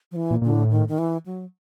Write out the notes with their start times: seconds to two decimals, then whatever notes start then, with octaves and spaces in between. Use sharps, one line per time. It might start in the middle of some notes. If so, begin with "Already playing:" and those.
0.12 F3
0.16 E3
0.31 A#2
0.42 A#2 D3
0.51 A2
0.71 D#3
0.88 D#3
0.99 E3
1.26 F#3